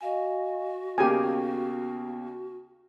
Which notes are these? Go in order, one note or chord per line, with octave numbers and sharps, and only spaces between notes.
F#4 D#5 F5 G#5
D#2 C#3 A#3 B3 G4 G5 G#5